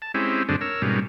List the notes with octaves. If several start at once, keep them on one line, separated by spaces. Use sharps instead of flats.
A5
G#3 C4 C#4 E4 G4
F#2 D3 G#3 C4 D4
A#4 C#5 E6
G#2 B2 G3 A#3 C#4